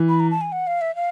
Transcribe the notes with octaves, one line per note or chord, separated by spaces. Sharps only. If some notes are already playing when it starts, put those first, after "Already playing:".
Already playing: E3
B5
A#5
A5
G#5
F#5
F5
E5
F5